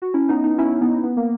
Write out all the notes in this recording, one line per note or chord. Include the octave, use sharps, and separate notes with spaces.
F#4
C#4 E4
B3 D#4
B3 D#4
C#4 E4
B3 D#4
B3
A#3